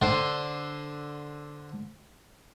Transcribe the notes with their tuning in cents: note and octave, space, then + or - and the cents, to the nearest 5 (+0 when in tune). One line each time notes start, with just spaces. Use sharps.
D3 +0 C5 +0